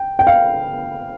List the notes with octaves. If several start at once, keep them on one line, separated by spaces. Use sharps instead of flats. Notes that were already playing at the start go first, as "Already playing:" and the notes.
Already playing: G5
G5
F5